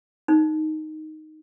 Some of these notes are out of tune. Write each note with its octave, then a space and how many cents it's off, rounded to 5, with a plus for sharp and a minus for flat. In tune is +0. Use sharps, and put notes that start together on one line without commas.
D#4 +0 C5 +0